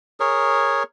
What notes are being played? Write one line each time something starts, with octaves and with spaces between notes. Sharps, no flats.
G#4 A#4 C#5